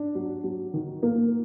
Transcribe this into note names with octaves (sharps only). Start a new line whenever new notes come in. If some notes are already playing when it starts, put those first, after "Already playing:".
Already playing: D4
F#3
F#3
D#3
A#3